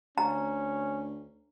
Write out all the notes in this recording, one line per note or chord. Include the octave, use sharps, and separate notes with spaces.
D2 C#4 A#5